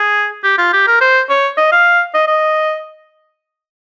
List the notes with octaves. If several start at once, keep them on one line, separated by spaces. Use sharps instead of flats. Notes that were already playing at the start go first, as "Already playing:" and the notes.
Already playing: G#4
G4
F4
G4
A#4
C5
C#5
D#5
F5
D#5
D#5